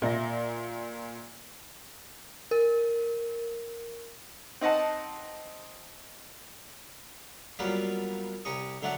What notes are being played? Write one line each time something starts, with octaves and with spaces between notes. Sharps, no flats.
A#2 D5 E5 A#6
A#4
C4 D#4 D#5 F#5 A5
F#3 G3 A#3 B3 F4 D5
C2 G4 A#5 C#6 D#6
D3 F#3 A3 D5 F#5